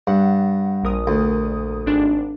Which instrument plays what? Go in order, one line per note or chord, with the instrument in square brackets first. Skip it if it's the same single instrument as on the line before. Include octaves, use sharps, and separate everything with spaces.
[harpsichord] G2 [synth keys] F#5
[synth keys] A#1 A#4 D#6
[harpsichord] D2
[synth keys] G#1 D4